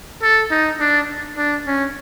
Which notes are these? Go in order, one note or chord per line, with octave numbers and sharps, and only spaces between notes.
A4
D#4
D4
D4
C#4